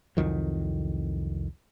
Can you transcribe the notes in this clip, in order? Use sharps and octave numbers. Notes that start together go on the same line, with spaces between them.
C2 F2 D#3 F#3